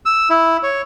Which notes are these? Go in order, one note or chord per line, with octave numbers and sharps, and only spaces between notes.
E6
E4
C#5